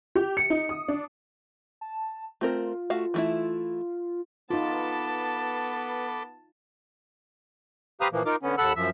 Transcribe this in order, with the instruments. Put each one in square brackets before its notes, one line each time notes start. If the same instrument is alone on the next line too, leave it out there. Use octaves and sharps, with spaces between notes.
[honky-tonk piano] G4
C#7
D#4
D#6
D4
[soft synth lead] A5
[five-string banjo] A3 C4 A#4 [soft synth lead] F4
[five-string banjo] A3 F#4 F5
E3 A3 E4
[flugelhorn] B3 [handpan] D#4 F4 [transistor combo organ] A4 B4 D6 [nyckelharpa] A5
[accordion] G4 B4 C5 F5 A#5 D#6
A#2 E3 F3 A#3
D#4 F4 A#4 D6
D3 B3 C#4
D#2 A4 F#5 B5 E6
F#2 F3 E5